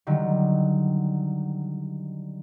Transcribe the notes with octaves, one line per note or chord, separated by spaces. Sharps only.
D3 D#3 F#3 G3